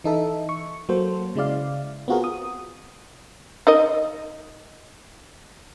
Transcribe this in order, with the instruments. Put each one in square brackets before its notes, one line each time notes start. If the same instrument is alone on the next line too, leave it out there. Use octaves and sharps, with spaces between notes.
[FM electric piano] E3 D#4 A4 E5
C#6
F#3 A#3 F#4 A4 C5
C#3 G#3 E4 D5 F5
B3 C4 F4 F#4 G#4 A#4
D#6
[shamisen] D#4 A#4 D#5